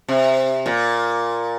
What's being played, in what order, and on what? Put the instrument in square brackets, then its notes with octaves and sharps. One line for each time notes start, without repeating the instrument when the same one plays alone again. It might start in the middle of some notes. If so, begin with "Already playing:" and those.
[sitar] C3
A#2